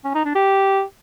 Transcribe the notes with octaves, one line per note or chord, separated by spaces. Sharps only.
C#4
D#4
D4
G4